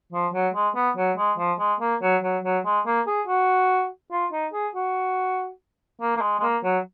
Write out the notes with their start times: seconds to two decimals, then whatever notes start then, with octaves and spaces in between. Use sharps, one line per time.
0.13 F3
0.34 F#3
0.54 G#3
0.75 B3
0.97 F#3
1.18 G#3
1.38 F3
1.59 G#3
1.81 A#3
2.02 F#3
2.23 F#3
2.44 F#3
2.65 G#3
2.86 A#3
3.07 G#4
3.27 F#4
4.12 F4
4.32 D#4
4.53 G#4
4.75 F#4
6.01 A#3
6.16 A#3
6.21 G#3
6.39 G#3
6.43 A#3
6.64 F#3